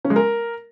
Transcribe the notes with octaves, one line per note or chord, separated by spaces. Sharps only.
C#4
G#3
A#4